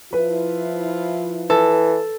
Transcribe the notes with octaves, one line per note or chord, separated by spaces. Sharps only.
F3 E4 F4 B4
E3 A4